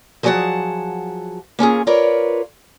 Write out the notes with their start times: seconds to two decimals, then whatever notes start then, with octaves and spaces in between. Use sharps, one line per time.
0.23 F3 F#3 G#4 D5 F#5 A5
1.59 A#3 C#4 F4 G#4
1.87 F4 A#4 B4 C#5 D5